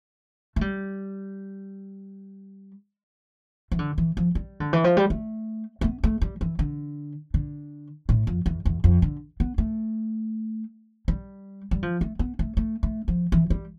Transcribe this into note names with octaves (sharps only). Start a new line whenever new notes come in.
A3
G3
E3
D3
E3
F3
G3
D3
E3
F3
G3
A3
A3
B3
A3
G3
E3
D3
D3
A2
F2
E2
E2
F2
D3
B3
A3
G3
G3
F3
A3
B3
A3
A3
A3
F3
E3
G3